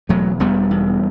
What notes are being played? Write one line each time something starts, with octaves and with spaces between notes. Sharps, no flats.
E1 F#3 A3
E1 G3 B3
E2